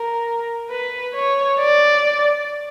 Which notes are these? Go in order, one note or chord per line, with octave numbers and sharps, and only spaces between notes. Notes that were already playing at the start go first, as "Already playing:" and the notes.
Already playing: A#4
B4
C#5
D5